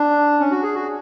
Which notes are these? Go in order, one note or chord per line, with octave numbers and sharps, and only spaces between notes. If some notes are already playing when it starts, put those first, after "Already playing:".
Already playing: D4
C#4
F#4
G#4
F#4